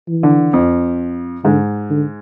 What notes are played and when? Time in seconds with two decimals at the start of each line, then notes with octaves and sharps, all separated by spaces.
0.08 E3
0.23 D3
0.53 F2
1.44 G#2 D3
1.90 D3